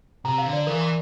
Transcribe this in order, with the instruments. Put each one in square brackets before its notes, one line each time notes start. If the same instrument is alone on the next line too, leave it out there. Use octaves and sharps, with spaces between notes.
[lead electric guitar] C3 [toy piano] A#5
[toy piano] F5
[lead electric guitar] D3
[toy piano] D5
[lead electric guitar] E3 [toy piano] A#4
[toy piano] C6